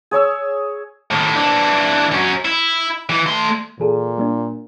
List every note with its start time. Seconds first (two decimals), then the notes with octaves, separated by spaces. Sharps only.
0.11 G#4 C#5 C#6 E6
1.11 A2 D#3
1.36 E3 D4
2.12 F#2 C#4
2.45 E4
3.09 E3
3.26 A3 C6
3.80 A#2 E3 G#4 A4
4.18 G3 A#3 D4